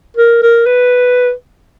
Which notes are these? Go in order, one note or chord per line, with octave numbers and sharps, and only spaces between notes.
A#4
A#4
B4